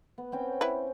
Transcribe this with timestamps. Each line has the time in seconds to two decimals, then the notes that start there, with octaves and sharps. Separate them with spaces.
0.18 B3
0.32 C4 C#4 G5
0.61 E4 B4